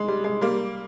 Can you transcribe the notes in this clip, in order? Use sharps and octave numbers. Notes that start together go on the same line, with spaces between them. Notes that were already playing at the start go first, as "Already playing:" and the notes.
Already playing: G#3
G3
G#3
G3 A#3